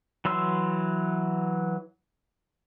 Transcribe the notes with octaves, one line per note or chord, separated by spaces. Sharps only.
E3 F#3 C6 E6